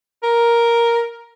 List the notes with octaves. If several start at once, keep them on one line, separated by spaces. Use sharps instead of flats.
A#4